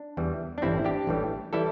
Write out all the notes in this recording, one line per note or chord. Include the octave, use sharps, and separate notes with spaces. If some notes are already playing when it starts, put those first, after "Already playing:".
Already playing: D4
E2 E3 G3
D4
A1 G2 E3 G3 C4 E4
D4 G4
A1 A2 E3 G3
E3 G3 E4 A4